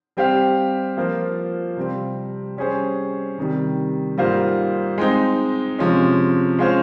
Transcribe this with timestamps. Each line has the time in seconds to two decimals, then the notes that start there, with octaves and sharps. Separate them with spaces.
0.17 G3 C4 G4 C5 F5
0.97 F3 A#3 F4 C5
1.77 C3 G3 C4
2.57 G3 C#4 G#4 C5
3.38 C3 D#3 G3
4.18 G#2 G3 A#3 F4 C5
4.98 G#3 C4 D#4
5.79 C3 F3 G#3 C#4
6.59 G#3 C#4 F4 C5